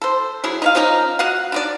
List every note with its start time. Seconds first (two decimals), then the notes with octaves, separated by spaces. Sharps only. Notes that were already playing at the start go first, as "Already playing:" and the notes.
0.02 A4 C5
0.44 F#3 E4 G#4
0.62 D#4 C#5 F5
0.75 F3 A#3 C#4 D#4
1.19 F#4 D#5 F5 F#5
1.52 D4 D#4 D5